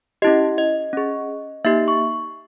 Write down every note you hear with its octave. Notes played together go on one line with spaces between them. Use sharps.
C#4 E4 G4 D#5
D#5
C#4 G#4
A#3 D#4 G4 E5
C#6